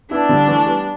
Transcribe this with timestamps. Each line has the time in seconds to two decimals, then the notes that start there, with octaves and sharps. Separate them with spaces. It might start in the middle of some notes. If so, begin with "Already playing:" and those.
0.11 B3 D4 E4
0.29 D3 G3
0.47 E3 A3
0.66 G3 B3